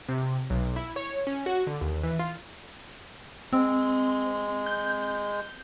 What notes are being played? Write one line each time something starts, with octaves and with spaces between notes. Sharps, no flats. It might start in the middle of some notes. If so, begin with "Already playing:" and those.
C3
B1
E4
C#5
C#4
F#4
D3
D#2
E3
F4
G#3 C4
G6